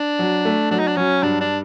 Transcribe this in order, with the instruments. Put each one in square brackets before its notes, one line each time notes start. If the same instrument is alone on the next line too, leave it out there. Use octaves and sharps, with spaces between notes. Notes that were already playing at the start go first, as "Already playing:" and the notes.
Already playing: [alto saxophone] D4
[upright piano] F#3
A3
[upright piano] F#3 [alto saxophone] D4
[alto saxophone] D#4
D4
[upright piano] F#3 [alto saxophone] C#4
[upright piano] G2 [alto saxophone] D4
[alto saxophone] D4